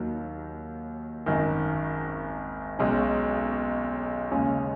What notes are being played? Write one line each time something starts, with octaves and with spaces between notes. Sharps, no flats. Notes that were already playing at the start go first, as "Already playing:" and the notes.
Already playing: D#2 D#3 F#3
G#1 F#2 D#3
B1 B2 G#3 C#4
D#2 C#3 G#3 C#4